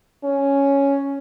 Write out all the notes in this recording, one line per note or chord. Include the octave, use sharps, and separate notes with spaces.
C#4